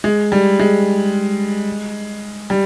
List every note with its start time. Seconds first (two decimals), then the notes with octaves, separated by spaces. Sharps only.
0.04 G#3
0.32 G3
0.59 G#3
2.50 G3